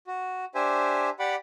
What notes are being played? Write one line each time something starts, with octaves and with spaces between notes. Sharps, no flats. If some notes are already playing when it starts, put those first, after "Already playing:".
F#4
D4 G4 C5 E5 G#5
G4 D5 F#5 B5 D6